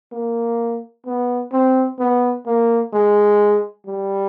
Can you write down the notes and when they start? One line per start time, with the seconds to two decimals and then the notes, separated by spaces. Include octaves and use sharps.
0.12 A#3
1.06 B3
1.52 C4
1.99 B3
2.46 A#3
2.93 G#3
3.86 G3